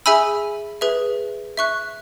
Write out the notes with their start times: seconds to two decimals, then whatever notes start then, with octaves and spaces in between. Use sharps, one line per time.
0.06 G#4 E5 G#5 B5 E6
0.81 G#4 B4 E5
1.57 E5 C#6 F#6